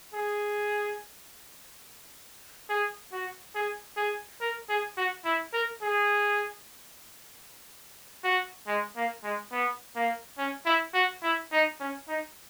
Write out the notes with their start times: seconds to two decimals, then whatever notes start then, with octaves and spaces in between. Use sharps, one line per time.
0.14 G#4
2.70 G#4
3.12 F#4
3.55 G#4
3.97 G#4
4.41 A#4
4.69 G#4
4.97 F#4
5.25 E4
5.54 A#4
5.82 G#4
8.24 F#4
8.68 G#3
8.96 A#3
9.24 G#3
9.52 B3
9.96 A#3
10.38 C#4
10.66 E4
10.94 F#4
11.23 E4
11.52 D#4
11.80 C#4
12.08 D#4